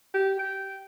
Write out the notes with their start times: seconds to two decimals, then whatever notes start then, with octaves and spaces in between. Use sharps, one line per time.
0.14 G4
0.39 G5